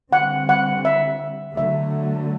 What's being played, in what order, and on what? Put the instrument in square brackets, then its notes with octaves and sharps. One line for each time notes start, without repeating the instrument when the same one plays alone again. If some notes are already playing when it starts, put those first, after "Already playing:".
[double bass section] D3 G3 C4 [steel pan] F#5
[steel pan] F#5
E5
[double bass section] D3 F#3 A3 [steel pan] E5